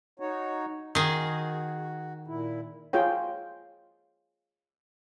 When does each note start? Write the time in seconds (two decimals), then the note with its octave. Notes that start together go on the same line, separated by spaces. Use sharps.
0.20 D#4 F#4 C#5
0.95 D#3 F#4 G#4
2.28 A#2 E4
2.93 F4 G#4 C#5 G5